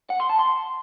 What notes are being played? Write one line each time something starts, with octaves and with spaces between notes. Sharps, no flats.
F#5
C6
A5
C6